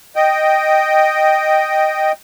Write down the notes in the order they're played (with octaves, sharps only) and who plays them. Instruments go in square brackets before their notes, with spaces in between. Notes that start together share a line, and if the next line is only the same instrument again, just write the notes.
[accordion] D#5 G5